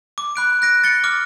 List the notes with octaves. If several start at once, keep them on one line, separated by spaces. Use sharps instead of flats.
D6
B5 F#6 D7
F#6 A#6 D7
A6 C#7 G7
D6 F6